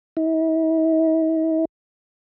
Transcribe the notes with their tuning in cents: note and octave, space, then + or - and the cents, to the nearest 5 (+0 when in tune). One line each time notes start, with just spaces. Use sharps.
E4 -45